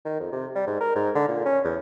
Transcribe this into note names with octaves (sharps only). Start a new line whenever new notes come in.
D#3
F2
C3
G3
G#2
A#4
G#2
D3
A#2
C#4
E2